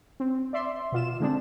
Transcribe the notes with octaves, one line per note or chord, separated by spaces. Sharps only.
C4
D5 E5 C6
B2 F4 E7
D3 G#3 C4 D4